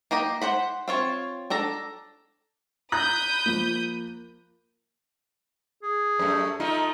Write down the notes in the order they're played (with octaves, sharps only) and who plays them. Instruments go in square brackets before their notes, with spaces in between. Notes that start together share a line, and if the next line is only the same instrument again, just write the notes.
[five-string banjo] A#3 G4 D#5 G5
C5 F#5 B5
C4 F4 C#5
D4 A4 A#5
[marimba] A#5 [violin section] B5 D#6 G6 [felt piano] F#6
[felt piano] F3 A#3
[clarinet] G#4
[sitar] F#2 A3
A3 D#4 F4